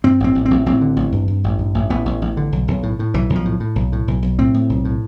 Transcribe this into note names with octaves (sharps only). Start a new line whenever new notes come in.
G2 C4
A1 C4
A1
A1 C4
A1 C4
D3
A1
G2
G2
A1
G2
A1
A1 B3
A1
A1
D3
B1
B1
A2
A2
B1 E3
B1
F3
A2
A2
B1
A2
B1
B1
A2 C4
A2
B1
A2